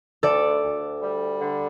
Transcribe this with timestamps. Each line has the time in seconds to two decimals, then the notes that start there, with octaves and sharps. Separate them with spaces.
0.23 D2 A4 D5
0.63 D2
1.02 G3
1.41 D3